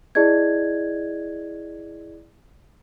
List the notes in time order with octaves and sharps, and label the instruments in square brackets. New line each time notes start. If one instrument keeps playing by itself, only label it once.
[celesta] E4 G#4 D5 D#5 G#6